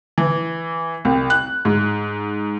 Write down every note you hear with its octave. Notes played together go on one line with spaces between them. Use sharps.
E3
C2
F#6
G#2